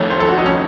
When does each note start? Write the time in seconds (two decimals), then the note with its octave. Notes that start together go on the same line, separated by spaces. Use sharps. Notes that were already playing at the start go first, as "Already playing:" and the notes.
Already playing: F2 D#3 A3 C#5
0.10 C5
0.20 A4
0.29 F#4
0.38 D#4
0.46 C#4